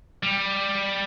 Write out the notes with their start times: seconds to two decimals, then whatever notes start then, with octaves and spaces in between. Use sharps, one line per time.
0.23 G3